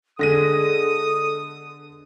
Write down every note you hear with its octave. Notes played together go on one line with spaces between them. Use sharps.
D3 G#3 B3 G#4 A4 D#6 A#6 D#7